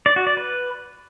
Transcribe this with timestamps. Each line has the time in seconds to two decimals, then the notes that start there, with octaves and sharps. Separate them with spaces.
0.06 D5
0.16 F#4
0.27 D5
0.37 B4